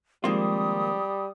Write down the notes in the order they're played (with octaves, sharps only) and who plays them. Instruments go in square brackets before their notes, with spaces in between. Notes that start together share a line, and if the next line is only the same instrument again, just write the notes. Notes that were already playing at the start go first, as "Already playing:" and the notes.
[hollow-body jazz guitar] D#3 A#3 F4 [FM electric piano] F3 G#3 C4 [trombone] G3 [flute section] D#6